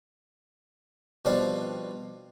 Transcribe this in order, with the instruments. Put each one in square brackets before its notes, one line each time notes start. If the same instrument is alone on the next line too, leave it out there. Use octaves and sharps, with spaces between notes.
[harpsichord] B2 F3 G3 C4 D4 F5